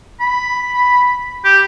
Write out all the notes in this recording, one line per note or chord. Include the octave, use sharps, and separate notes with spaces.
B5
G4